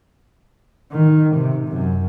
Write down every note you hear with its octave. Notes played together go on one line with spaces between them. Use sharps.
D#3
C3
F#2